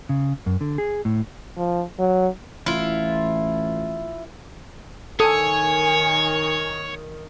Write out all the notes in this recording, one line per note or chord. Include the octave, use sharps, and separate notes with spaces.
C#3
F#2
D3
G#4
A2
F3
F#3
A1 E4 F4
D#3 A4 C#5 G#5 D#6